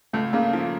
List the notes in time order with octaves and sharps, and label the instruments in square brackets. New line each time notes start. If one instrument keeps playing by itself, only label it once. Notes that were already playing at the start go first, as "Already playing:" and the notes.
[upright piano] C#2 [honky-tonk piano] A3
[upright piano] C#3 [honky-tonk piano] A#3
[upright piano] F3